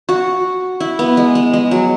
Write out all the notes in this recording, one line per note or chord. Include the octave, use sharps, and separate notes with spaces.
F#4
E4
B3
G#3
G#3
G#3
F#3